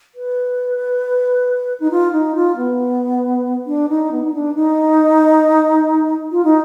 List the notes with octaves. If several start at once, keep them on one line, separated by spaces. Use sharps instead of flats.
B4
D#4
F4
D#4
F4
B3
D4
D#4
B3
D#4
D4
D#4
F4
D#4